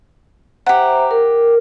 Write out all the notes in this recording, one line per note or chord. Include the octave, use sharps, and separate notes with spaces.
G4 C5 E5 F#5 A#5
A#4